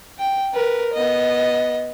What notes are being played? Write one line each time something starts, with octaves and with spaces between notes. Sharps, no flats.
G5
A#4 B4
B3 D#5